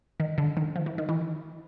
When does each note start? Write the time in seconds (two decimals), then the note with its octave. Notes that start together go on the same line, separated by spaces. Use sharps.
0.20 D#3
0.38 D3
0.57 D#3
0.76 F3
0.86 E3
0.98 D#3
1.09 E3